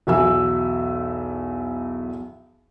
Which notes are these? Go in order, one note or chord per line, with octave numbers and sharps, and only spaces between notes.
B1 E2 F#4 E5 G#5 E6